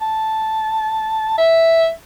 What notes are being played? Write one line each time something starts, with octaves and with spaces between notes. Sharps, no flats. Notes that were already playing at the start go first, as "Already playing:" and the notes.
A5
E5